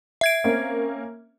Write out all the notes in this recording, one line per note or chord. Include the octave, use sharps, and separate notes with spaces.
E5 G#6 D7
A#3 C4 C#4